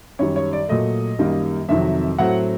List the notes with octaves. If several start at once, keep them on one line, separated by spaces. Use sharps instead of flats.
F#2 D#3 G3 C#5
C#5
D5
A#2 F#3 A3 D#5
F#2 D#3 G3 A#3
F2 C3 D#3 F#3 E5
A2 F#3 A3 C4 F#5